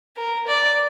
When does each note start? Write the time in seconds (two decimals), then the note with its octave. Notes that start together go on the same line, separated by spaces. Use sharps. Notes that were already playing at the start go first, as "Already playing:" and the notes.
0.17 A#4
0.47 D5